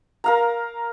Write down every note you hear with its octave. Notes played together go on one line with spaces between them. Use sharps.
A#4 F5 A#5